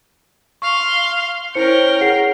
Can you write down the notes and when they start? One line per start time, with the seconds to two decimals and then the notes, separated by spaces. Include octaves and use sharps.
0.62 F5 C6 C#6
1.55 C#4 E4 A#4 C5 G5 C#7
2.01 G#4 F#5 C7